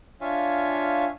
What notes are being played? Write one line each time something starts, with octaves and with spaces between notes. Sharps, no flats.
D4 F4 C#5 E5 F5 G#5